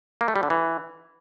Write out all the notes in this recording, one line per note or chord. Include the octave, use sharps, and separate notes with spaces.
A#3
A3
G3
D3
E3